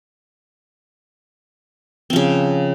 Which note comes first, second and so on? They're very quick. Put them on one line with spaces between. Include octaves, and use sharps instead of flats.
C4 F3 C#3